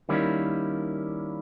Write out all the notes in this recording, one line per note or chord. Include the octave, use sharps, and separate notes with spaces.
D#3 G3 A#3 C#4 E4